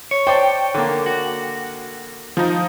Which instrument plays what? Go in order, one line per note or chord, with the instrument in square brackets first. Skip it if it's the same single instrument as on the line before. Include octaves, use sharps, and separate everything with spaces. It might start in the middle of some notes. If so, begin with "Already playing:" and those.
[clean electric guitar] C#5
[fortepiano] C5 D5 A5 [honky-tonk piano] G5
[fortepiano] D3 A#3
[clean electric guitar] F#4
[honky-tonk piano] F3 D#4